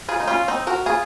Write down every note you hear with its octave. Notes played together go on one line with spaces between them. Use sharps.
F4 G#4
D#4
C#4 F4
C4 D#4
F#4 A#4
F4 G#4